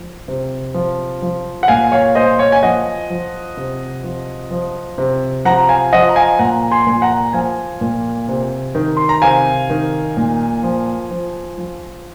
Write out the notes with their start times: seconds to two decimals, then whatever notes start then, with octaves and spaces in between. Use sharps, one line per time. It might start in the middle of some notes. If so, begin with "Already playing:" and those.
Already playing: F3
0.28 C3
0.74 F3
1.22 F3
1.63 F#5
1.68 A#2 F5 G#5
1.92 C#5 F5
2.15 A#2 C5 D#5
2.39 C#5 F5
2.52 G#5
2.63 F3 D#5 F#5
3.10 F3
3.57 C3
4.04 F3
4.51 F3
4.98 C3
5.45 F3 F#5 A#5
5.69 F5 G#5
5.93 F3 D#5 F#5
6.09 A#5
6.16 F5 G#5
6.39 A#2 F#5 A#5
6.71 G#5 C6
6.87 A#2
7.02 F#5 A#5
7.33 F3 F5 G#5
7.81 A#2
8.28 C3
8.75 D#3
8.97 C6
9.09 A#5
9.22 C3 F5 G#5
9.70 D#3
10.17 A#2
10.63 F3
11.11 F3
11.58 F3